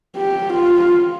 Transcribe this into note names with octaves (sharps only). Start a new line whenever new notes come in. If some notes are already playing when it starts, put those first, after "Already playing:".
G4
F4